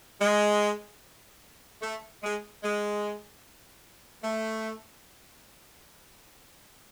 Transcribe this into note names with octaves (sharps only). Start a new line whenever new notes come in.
G#3
A3
G#3
G#3
A3